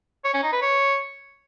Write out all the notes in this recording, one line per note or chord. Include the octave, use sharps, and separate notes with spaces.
C#5
C#4
D#4
B4
C#5